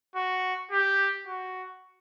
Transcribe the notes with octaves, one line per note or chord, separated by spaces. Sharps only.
F#4
G4
F#4